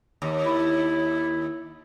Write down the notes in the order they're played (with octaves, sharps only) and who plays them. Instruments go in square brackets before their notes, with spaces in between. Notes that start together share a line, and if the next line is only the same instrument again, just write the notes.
[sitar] D#2
[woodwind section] E4